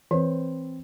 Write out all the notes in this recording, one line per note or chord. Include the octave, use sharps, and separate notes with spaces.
E3 C4 B4 C5